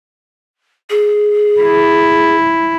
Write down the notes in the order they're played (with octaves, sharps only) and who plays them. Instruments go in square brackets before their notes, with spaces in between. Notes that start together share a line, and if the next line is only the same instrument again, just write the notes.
[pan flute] G#4
[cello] E4